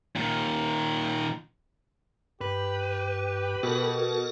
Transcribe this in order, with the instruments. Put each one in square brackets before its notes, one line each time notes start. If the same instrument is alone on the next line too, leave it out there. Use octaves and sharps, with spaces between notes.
[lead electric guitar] A#2 D#3
[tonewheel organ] G2 [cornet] G4 [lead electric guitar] B4
[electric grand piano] B2 [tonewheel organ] F#4 A4 A#4